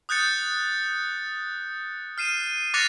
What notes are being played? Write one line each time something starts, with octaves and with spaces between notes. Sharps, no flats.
D#6 F#6 G6 A6 C#7
F6 C7 D#7 E7
D6 F#6 A6 A#6 C#7 F7